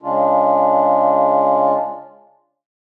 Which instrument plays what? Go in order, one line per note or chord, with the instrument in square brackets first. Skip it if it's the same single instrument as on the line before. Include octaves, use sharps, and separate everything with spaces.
[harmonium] C#3 G#3 D4 F4